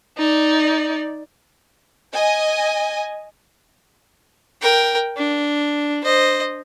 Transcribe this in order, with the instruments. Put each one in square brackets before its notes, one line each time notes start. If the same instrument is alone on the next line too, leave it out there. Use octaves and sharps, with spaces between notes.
[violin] D#4 D5
[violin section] D#5 G#5
[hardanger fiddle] A#4 G5
D4
C5 D#5